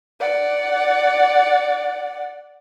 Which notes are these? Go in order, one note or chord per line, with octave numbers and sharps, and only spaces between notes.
D5 F#5